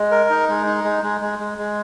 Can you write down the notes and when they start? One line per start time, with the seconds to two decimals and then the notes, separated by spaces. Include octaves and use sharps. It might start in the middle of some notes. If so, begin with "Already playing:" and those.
Already playing: G#3
0.11 A#4
0.30 D#4
0.49 G#3
0.67 D#4
0.84 G#3
1.02 G#3
1.21 G#3
1.39 G#3
1.58 G#3